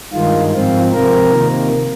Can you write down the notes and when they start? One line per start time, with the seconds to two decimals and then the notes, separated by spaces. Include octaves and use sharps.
0.13 G2 D#3 G#3 F4
0.52 G#2 F3 C4 F4
0.91 C3 F3 C4 A#4
1.32 C3 D#3 A#3